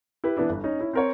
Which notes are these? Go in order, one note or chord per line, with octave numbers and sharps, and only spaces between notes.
E4 G4 B4
E3 B3 D4 E4
G1
C#4 D#4
C#4 E4
C4 A#4 C#5